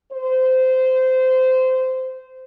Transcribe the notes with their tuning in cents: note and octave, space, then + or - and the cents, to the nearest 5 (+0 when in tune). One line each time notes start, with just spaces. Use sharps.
C5 -15